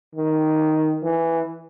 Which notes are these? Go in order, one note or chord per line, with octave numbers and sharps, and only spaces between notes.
D#3
E3